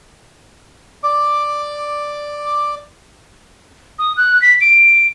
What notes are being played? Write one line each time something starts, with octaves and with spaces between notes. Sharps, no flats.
D5 D6
D#6
F#6
B6
D7